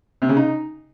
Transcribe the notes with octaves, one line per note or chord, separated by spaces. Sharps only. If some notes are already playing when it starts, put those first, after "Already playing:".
C3
C#3
D#4